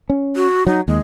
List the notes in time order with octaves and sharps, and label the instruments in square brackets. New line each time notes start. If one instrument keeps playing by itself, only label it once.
[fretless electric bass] C#4
[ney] F#4
[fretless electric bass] F#3 [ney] D#4
[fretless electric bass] D#2 [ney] G#3